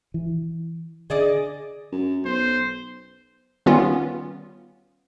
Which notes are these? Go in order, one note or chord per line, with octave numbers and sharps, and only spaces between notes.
E3
D3 G#4 D5 D#5
F#2
B1 C5
D#3 G3 B3 C#4 F4